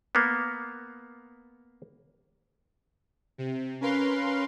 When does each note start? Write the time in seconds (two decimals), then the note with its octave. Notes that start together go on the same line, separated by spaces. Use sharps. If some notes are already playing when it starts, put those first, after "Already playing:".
0.15 A#3 B3
3.38 C3
3.81 C#4 A#4 B4 F5 C6